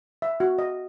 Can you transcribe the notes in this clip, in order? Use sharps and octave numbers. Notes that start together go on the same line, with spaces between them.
E5
F#4
D#5